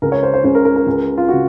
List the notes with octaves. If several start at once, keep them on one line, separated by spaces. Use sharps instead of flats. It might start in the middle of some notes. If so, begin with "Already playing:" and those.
C#2 C#3 A#4
C#5
C5
C5
C#2 C#3 C5
A#4
A#4
A#4
C#2 C#3
F4
C#3 F#4